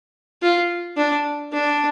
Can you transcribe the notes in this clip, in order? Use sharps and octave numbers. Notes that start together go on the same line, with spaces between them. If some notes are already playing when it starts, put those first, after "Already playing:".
F4
D4
D4